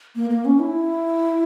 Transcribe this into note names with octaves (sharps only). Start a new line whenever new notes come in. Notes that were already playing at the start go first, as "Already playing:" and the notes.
A#3
A#3
C#4
E4